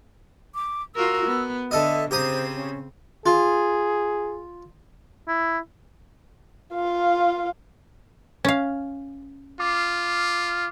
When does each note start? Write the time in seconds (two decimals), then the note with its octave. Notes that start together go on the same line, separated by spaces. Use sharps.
0.55 D6
0.95 F4 F#4 A#4 E6
1.26 B3
1.71 D3 A4 D#5 E5
2.11 C#3 C4 G4 C5 A#5 D#6
2.55 C#4
3.26 F4 G#4
5.28 E4
6.74 F4 F5
8.45 C#4 F5
9.60 F4 D6 F6 C7